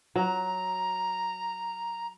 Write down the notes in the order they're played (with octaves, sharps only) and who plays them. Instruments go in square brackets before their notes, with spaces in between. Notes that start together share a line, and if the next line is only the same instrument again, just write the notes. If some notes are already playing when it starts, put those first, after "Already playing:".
[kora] F#3 [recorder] A#5